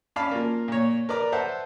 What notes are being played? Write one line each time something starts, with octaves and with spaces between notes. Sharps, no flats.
C#4 D5 F5 A5 B5
A#3 F4
A#2 C#5
A#4 B4 D5 A#5
B4 C5 E5 F#5 A5